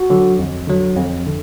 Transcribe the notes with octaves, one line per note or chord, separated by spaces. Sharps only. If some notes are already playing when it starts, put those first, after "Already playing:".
Already playing: F#4
D3 F#3
F2
D3 F#3
F2
D3